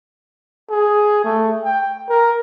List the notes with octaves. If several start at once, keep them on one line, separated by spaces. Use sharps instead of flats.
G#4
A3
G5
A#4